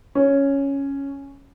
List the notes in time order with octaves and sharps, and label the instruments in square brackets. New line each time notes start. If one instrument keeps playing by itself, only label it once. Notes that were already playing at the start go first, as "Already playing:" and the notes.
[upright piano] C#4